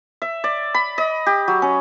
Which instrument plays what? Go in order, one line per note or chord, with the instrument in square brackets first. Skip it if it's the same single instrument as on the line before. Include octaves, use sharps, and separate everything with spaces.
[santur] E5
D5
B5
D#5
G4
F#3
C#4